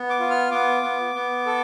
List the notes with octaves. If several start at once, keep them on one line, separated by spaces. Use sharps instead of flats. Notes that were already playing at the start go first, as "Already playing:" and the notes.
Already playing: B3
D6
F4
F6
B3 D6
B3
B3
A4